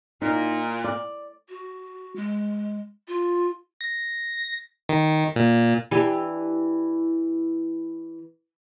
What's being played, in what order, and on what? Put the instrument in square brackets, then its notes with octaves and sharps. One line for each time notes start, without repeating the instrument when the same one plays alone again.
[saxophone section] A#2 [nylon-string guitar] D#4
[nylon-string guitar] D5
[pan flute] F#4
G#3
F4
[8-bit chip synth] A#6
D#3
A#2
[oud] E3 D4 G4